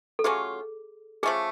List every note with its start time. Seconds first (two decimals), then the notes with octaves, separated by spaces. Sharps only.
0.19 A4
0.24 F#3 A3 C#4 F4 G#4
1.23 F3 A3 C#4 G#4